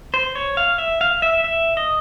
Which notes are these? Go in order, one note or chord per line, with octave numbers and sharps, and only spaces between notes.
C5
C#5
F5
E5
F5
E5
E5
D#5